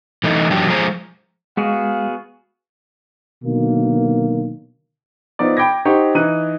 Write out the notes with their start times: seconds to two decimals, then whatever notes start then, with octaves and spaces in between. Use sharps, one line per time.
0.24 E3 A3 D#4
0.51 F#2 E3 F#3 D4 G4
0.67 F3 G#3 G#4 C5 A#5
1.57 G#3 B3 F#4 G#4 F5
3.44 B2 D3 D#3 F#3 A#3
5.39 F3 B3 D#4 D5
5.57 G5 B5 D6 G#6 A#6
5.85 D#4 G4 C5 F#5 C#6
6.15 E3 D#4 F#6 D#7